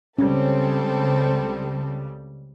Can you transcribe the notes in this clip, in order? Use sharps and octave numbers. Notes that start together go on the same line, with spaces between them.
C#2 C#3 G3 C4 C#4 A4 C#5